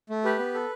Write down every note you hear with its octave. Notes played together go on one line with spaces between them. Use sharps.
A3
G4 B4
B3
A4